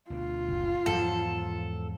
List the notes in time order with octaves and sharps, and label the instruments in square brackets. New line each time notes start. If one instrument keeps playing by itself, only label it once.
[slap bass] D2 B2 D3 [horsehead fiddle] F4
[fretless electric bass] F#1
[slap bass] E2 G#3 [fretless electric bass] G#2 F3 F#3 [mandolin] A4